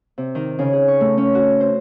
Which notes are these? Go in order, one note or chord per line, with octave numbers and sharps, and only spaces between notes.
C3
D#3
C#3
G#4
C#6
A3
C#4
F#4
C5